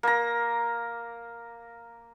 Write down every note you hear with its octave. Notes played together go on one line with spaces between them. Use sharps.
A#3 A#5